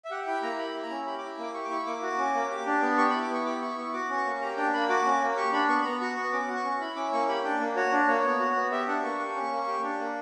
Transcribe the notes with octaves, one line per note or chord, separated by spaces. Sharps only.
E5
G4 F#5
E4 G5
A#3 A#5
G4 B5
E4
A#5
C#4
G4 B5
D6
E4
A#3 D6
G4 C#6
D6
E4 C#6
A#3 D6
F#4
C#4
A#3
G4
D4
B3
G4 C#6
B5
E4
D6
B3 C#6
G4 D6
E4 C#6
B3 C#6
F#4 D6
C#4
C#6
A#3
G4 A#5
D4 G5
A#3 B5
F#4 D6
C#4
A#3
G4 C#6
D4 B5
B3 C#6
B5
B3 A#5
F#4 C#6
B3 C#6
C#4 D6
F#4
C#6
C#4
E4 B5
C#4 D6
A#3 C#6
G4 B5
D4 G5
A#3
F#4 C#5
D4
A#3 C#5
B3
F#4
B3
G4 E5
D4 F#5
A#3 C#6
G4
C#4
A#3
G4
D4
A#3